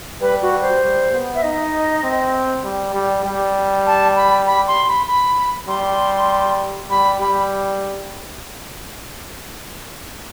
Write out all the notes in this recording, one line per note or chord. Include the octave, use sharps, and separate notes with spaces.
G3 B4
F#4
C5
G3
B3
E5
D#4 D#5
C4
G3
G3
G3
A5
B5
B5
C6
B5
B5
G3 C6
G3 B5
G3 B5